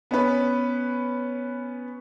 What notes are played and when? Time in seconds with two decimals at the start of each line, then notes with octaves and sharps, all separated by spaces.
0.11 B3 C#4 B4